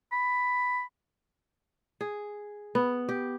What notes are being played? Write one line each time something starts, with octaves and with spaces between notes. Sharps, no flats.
B5
G#4
B3
G4